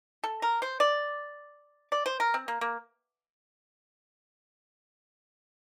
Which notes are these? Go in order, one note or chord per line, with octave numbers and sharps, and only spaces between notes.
A4
A#4
C5
D5
D5
C5
A#4
C4
A#3
A#3